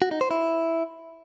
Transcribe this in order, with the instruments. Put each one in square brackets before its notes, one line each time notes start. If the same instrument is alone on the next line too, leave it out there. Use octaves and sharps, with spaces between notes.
[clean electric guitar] F#4
D#4
C5
E4